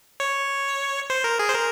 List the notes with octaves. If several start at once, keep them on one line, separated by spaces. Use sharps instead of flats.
C#5
C5
A#4
G#4
C5
A#4